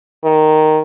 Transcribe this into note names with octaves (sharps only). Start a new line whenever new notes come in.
D#3